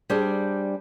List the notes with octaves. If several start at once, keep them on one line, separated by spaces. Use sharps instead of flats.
G3 D4 G#4 C5 D5